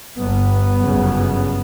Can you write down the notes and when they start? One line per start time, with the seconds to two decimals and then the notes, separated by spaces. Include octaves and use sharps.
0.19 G1 G2 B3
0.83 G1 F#2 C#3